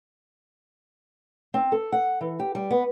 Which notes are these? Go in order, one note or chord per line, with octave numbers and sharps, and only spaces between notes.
C4
A4
F#5
E3
G4
G3
B3